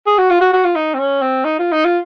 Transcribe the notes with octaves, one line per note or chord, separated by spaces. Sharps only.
G#4
F#4
F4
F#4
F#4
F4
D#4
C4
C#4
C4
D#4
F4
D#4
F4